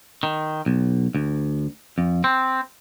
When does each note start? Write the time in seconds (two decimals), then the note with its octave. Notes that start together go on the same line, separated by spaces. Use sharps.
0.23 D#3
0.66 B1
1.15 D2
1.98 F2
2.24 C4